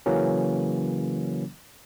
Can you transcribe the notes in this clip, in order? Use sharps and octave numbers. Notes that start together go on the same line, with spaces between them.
C#3 E3 F#3 A#3 C#4